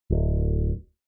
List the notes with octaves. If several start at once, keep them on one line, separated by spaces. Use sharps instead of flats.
D1